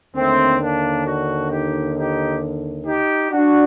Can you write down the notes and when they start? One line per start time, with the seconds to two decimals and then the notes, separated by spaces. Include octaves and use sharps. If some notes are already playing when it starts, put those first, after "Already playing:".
0.15 D#2 D3 A3 C4
0.61 A#3 D4
1.06 D4 F#4
1.51 D#4 G4
1.97 D#4 G4
2.87 D#4 G4
3.32 D4 F#4